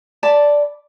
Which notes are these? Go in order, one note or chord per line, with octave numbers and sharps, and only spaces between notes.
D5 A5 B5